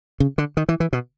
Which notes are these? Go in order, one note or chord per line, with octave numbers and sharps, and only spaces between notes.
C#3
D3
D#3
E3
E3
B2